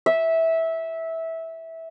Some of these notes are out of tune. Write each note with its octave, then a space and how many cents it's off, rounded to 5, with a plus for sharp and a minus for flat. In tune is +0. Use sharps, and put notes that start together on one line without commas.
E5 -15